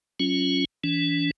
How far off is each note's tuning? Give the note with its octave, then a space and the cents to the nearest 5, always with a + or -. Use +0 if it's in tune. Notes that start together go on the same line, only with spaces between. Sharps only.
F#3 +0 C#4 -5 F4 +5
E3 +0 D4 -45